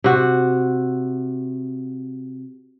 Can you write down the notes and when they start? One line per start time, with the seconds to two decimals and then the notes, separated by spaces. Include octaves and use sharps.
0.04 C3 F#4